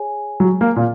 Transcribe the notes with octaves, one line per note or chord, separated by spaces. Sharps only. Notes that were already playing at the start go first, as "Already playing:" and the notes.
Already playing: G#4 C#5 G#5
F#3
A#3
A#2